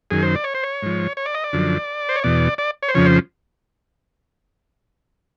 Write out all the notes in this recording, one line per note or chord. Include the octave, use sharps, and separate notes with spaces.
F#2 D#3 G#4
C5
D5
C#5
C5
C#5
G#2 F3
C#5
D5
D#5
D5
F#2 D3 F3
C5
C#5
E2 B2 D5
D5
C#5
C5
F2 C#3 F3 C#5
C5